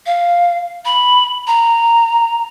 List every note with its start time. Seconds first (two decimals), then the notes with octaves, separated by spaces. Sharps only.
0.06 F5
0.85 B5
1.47 A#5